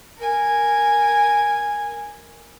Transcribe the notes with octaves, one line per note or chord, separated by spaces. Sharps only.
A#4 G#5